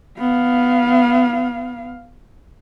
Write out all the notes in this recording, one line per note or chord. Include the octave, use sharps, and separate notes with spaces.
B3 F5